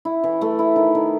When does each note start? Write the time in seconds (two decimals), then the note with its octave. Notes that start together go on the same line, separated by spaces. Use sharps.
0.05 E4
0.24 E3
0.41 A3
0.59 E4
0.76 D#3
0.95 D#3